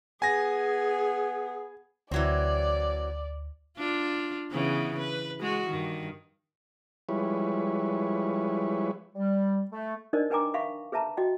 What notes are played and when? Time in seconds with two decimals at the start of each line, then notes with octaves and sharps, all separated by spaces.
0.22 B3 G#4 G#5 A#6
2.11 D2 E3 F#3 C4 D5
3.78 D4 F4
4.50 C#3 E3 B3
4.99 B4
5.40 G#3 F#4
5.69 G2 D#3
7.09 F3 G3 G#3 E4 B4 C#5
9.13 G3
9.70 A3
10.13 D4 D#4 A#4 C5 D5 D#5
10.30 A#4 B4 G5 G#5 A#5 D6
10.54 E5 F5 B5 C#6
10.92 G#4 B4 E5 A5 A#5
11.17 F#4 D#5 G5